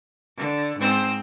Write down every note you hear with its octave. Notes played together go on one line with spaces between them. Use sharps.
D3
G#2 C4 C5